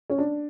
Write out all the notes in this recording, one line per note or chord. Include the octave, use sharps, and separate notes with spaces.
C#4
D4